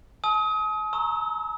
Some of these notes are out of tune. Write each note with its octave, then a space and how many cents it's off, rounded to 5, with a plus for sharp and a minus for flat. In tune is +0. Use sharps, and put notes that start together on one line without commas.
A5 -45 D#6 +35
A#5 +0 C#6 -25 E6 -35